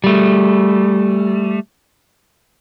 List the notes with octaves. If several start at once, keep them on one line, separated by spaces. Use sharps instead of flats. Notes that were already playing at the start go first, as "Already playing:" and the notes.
G3 A3